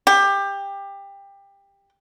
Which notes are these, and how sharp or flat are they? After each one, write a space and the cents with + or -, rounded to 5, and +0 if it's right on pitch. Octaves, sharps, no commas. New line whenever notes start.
G4 +20